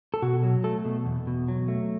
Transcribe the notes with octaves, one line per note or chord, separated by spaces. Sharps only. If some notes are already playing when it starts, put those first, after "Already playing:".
A4
B2 F#4
F#3
A3 A4
B2
E2
B2
F#3
A3